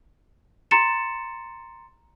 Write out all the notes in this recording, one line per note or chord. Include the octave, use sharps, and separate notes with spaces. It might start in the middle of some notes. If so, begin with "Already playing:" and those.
A#5 C6 A6 C#7 E7